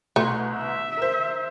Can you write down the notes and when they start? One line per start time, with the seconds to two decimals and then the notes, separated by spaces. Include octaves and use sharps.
0.16 C2 B2 A3 C6
0.56 E5
0.97 A#4 C5